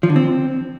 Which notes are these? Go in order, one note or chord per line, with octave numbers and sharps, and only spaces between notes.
F3
D3
C4